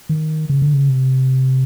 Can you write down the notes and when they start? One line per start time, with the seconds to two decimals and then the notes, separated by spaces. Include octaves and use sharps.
0.09 D#3
0.50 C#3
0.62 D3
0.73 C#3
0.89 C3